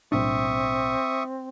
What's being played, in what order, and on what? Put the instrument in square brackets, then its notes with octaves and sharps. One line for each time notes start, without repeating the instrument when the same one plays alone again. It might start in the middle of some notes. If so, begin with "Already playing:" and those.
[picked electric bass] B1 A2 D4 [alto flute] C4 [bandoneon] E5 C#6 D#6